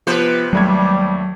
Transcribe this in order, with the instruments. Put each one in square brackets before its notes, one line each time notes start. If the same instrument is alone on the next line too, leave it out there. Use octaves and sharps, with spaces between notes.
[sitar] C3 B4 C5 [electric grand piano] F3 B3
[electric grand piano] D#2 A3 G#6 [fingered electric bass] F#3 [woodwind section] G3